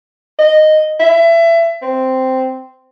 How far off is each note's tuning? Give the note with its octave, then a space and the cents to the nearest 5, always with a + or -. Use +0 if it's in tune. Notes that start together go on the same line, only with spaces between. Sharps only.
D#5 -5
E5 +25
C4 -5